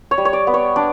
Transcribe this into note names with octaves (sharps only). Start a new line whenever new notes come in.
C#5
G3
C#5
D5
B3
C#5
D4 D5